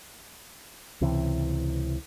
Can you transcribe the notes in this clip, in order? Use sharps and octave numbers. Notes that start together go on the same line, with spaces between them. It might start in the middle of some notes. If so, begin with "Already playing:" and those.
C#2 C3 E3